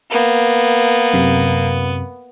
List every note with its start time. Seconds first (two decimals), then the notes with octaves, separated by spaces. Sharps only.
0.11 A#3 B3
1.14 F#2 C3